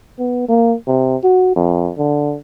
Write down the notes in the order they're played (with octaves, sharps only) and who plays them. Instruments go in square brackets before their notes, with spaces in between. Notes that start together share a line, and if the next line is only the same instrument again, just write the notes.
[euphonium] B3
A#3
C3
F#4
F2
D3